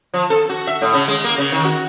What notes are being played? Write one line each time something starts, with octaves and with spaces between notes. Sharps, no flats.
F3
A4
F#4
E5
A2
C#3
G#3
A#3
C#3
D#3
F#4